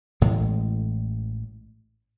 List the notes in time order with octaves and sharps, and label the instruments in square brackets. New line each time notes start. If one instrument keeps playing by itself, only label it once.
[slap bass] A1 A2 E3 G#3